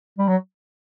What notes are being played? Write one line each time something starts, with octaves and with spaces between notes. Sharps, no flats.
G3
F#3